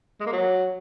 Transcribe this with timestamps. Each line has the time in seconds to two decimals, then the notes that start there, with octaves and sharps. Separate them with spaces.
0.20 G#3
0.26 A#3
0.33 F#3